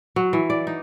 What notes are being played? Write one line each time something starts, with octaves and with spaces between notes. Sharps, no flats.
F#3
E3
D5
D#4